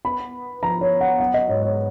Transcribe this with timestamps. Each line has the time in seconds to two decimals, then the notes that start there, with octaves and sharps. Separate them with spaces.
0.05 B3 B5
0.34 B3
0.62 F3 A#5
0.81 C#5
0.91 B3
1.01 F#5
1.20 F#3 F#5
1.34 D#5
1.48 G#2 C#5
1.63 C#5